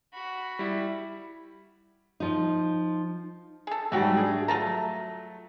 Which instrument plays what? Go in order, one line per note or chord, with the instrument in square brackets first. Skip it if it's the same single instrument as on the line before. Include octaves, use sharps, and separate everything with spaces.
[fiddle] F#4 B5
[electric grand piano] G3 E4
[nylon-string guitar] F3 D#4
[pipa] G#4 A4
[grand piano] G#2 F#3 G3 [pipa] A3 F#4 G5
[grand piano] D4 G#4
[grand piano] F#3 A3 [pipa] F4 A5 A#5